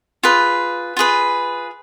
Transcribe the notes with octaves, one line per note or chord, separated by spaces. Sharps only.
F4 G#4 B4
F4 G#4 B4